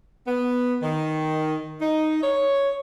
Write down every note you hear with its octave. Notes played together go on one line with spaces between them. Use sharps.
B3
D#3
D#4
C#5